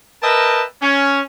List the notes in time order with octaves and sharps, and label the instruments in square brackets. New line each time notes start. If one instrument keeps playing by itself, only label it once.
[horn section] A#4 B4 D#5 E5 G5 A5
C#4